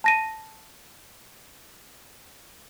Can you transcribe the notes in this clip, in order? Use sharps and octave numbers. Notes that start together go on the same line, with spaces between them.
A5 A#6 D#7